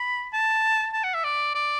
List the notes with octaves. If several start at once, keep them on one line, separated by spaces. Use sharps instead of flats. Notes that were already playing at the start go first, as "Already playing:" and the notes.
Already playing: B5
A5
A5
F#5
E5
D5
D5